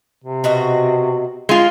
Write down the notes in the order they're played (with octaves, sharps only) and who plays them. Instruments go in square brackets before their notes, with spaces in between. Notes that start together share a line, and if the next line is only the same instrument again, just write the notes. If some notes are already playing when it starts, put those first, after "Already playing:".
[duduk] C3
[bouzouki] B2 F#4 D#5
[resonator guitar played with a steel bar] G#3 F4